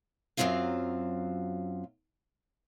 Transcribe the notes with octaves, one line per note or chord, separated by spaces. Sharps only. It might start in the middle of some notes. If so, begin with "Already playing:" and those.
F#2 E3 F#3 C4 F4 F5